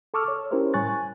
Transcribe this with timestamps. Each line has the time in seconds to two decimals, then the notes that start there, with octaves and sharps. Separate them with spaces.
0.14 A4 A5 C#6 D6 E6 F6
0.28 C#5
0.51 C#4 E4 G4 A#4 C5 C#5
0.74 A2 G3 G#5 C#6 F#6 A6
0.88 G#5